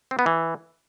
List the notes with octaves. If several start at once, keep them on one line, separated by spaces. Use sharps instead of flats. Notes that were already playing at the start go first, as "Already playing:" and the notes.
C4
B3
E3